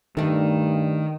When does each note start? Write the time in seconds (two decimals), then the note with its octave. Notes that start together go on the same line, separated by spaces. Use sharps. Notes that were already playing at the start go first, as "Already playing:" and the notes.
0.17 G2 D#3 A3 D4